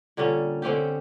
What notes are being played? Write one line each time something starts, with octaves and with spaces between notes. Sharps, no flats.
A#2 D3 G3 C#4
D3 C4 C#4 G4